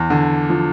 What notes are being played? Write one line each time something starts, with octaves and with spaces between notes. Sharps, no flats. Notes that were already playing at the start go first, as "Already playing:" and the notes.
Already playing: E2
D3
F3